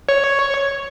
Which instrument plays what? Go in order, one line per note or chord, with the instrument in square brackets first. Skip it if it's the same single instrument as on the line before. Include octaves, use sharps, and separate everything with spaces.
[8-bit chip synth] C#5